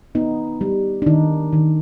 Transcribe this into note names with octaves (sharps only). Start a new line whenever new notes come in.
B3 D#4
G3
D4
D#3 D#4
D#3